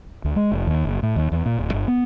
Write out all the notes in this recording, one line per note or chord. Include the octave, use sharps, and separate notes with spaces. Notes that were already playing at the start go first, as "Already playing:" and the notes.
D2
G#3
F1
D#2
F#1
A2
D#2
E2
A#2
D1
G1
B3